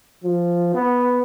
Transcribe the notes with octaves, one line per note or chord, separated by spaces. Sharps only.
F3
B3